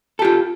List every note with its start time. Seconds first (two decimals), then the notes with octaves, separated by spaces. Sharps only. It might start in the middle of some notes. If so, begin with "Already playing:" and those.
0.19 A4
0.22 G4
0.25 F4